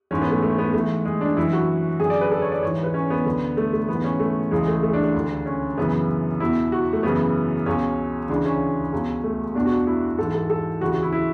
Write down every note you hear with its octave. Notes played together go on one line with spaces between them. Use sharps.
G#2 E3 C#4
B3
A3
A3
B3
G#2 E3 A3
G#3
D4
F#2 E3 E4
F#4
F#2 D3 G#4
D5
B4
A4
C#5
D5
G#2 E3 C#5
B4
C#4
B3
D2 D3
A3
A3
G#2 E3 B3
C#4
A3
C#2 C#3 E3 G#3
A3
A3
D4
D4
D2 D3
C#4
F#2 C#3 E3 B3
E2 B2 E4
F#4
A3
F#2 C#3 E3 B3
C#2 B2 C#4
D2 C#3 E3 D4
C#4
C#2 B2
A3
E2 B2 D4
F#4
E4
G#2 E3 A4
A4
A4
D2 C#3 E3 F#4
F#4
E4
E4